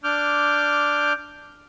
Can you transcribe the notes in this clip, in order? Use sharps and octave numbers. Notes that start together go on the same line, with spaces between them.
D4 D6 F6 G6